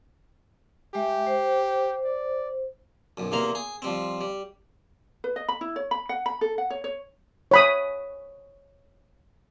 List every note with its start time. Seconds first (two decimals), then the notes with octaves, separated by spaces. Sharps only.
0.95 G#3 G4 E5
1.27 C5
2.05 D5
3.17 B1 F#2
3.32 E2 C3 A#3 C5 A#5
3.55 G#4
3.82 F3 G3 C4
4.21 G3
5.24 B4
5.36 D#5
5.49 B5
5.61 E4
5.76 C#5
5.91 B5
6.09 F#5
6.26 B5
6.41 A4
6.58 F#5
6.70 C#5
6.84 C#5
7.51 C#5 B5 D#6